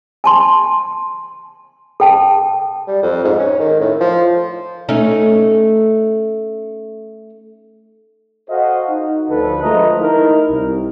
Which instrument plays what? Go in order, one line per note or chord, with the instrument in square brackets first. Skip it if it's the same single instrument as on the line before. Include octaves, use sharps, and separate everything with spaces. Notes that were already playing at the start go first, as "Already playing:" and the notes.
[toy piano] G#5 A5 C6
A4 G5 A5
[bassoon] G3
F2
G#2
C#4
D#3
A2
F3
[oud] A3 C#4 D#4
[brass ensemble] F#4 A4 C5 D#5 F5 F#5
D#4
D2 D3 F3 A4 B4
F3 G#3 A3 F4 D#5 A#5
D#4 E4 A#4
C2